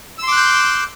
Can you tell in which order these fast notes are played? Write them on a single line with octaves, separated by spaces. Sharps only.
E6 C6 D6 F#6 G6